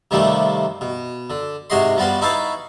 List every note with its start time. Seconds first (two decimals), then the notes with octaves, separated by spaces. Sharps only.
0.11 C3 D#3 F3 G3 A3 A#3
0.81 B2
1.30 D3
1.70 G#2 C3 F#4 C#5 D#5 C6
1.97 F3 G3 B3 F#4 F5
2.21 D#4 E4 B4 C#5 F5 A5